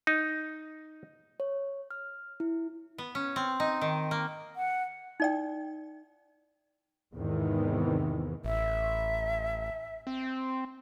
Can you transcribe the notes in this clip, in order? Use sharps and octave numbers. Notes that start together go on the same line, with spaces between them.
D#4
C#5
F6
E4
B3
C#4
C4
D#4
D#3
A#3
F#5
D#4 D5 G5
E2 G#2 C3 D#3 E3
A1 E5
C4